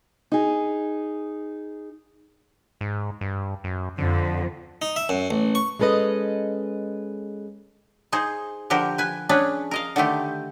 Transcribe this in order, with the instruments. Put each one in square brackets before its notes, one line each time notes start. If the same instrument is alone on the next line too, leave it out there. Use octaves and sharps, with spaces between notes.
[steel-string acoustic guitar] D#4 G#4
[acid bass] G#2
G2
F#2
[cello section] F2 [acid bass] D3
[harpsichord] D#4
E5
F#2
A1
C#6
[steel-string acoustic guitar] G#3 C#4 A4 B4 D#5
[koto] D#4 G#4 C5
D3 F3 G4 A#4
B4 G#5
C#4 D4 G#4 B4
A#4 D#5 F5
D3 D#3 A3 G4